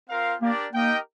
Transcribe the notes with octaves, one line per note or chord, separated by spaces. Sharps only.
C4 F4 A#4 F5
A#3 D4 G4 A#4 D5
A#3 D#4 G4 A#4 D#5 G5